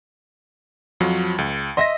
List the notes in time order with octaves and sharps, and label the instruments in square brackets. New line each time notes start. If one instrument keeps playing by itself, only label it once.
[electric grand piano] F2 F3 F#3
C#2
[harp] D#5 E5 [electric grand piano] C6 A#6